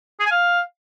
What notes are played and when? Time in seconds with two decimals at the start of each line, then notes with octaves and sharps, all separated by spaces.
0.20 G#4
0.26 G#5
0.31 F5